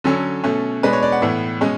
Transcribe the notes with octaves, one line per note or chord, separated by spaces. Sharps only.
D3 F#3 C#4 A4
B2 A3 C#4
B2 G#3 D4 B4
C#5
D5
F#5
A2 E3 B3
B2 G#3 C#4